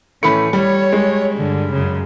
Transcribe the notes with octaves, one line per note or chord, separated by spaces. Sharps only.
A2 E3 A3 C#4 B5 C#7
G3 C#5
G#3
G2 D3
F#2 C#3